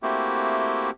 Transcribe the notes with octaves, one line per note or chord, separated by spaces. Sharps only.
A3 A#3 C4 E4 F#4 G4